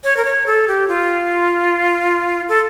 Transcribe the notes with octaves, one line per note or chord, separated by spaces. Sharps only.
C#5
A#4
C#5
A4
G4
F4
A4